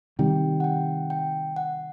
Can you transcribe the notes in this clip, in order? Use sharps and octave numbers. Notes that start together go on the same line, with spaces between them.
C3 D#3 G3 G5
F#5
G5
G5
F#5